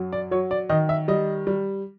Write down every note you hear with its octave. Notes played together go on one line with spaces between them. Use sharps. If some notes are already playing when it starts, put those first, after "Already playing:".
Already playing: F#2 F#3
D5
F#3 C#5
D5
D#3 D#5
E5
G3 D#5
G3